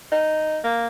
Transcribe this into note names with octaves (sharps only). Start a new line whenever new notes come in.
D#4
A#3